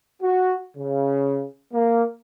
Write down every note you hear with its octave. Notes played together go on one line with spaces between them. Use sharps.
F#4
C#3
A#3